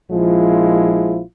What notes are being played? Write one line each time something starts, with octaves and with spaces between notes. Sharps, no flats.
A#1 F3 G#3 E4 F4